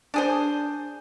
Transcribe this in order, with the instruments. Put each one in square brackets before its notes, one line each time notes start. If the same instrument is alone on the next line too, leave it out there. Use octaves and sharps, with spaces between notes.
[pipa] D4 G#4 C5